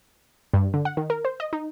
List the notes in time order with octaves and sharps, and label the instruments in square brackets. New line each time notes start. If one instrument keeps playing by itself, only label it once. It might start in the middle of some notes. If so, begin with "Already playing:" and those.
[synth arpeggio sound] G2
D3
F#5
D#3
A#4
C5
D#5
D#4